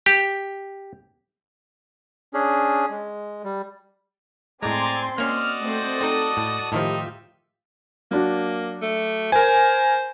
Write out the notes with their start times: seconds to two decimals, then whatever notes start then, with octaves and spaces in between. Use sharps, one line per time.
0.06 G4
2.34 C#4 D4 G#4
2.90 G#3
3.44 G3
4.63 A2 G#3 C4 D5 G#5 A#5 C6 D6
5.18 A#3 C#4 F#4 D5 D#5 F6
5.62 A3 C4 C5 D#6
6.01 C4 D#4 A4
6.37 A2 A5
6.72 A2 D#3 F3 D#4 F4 G4 E5
8.11 F#3 A#3 D4 F#4
8.82 A3
9.32 A#4 C5 G#5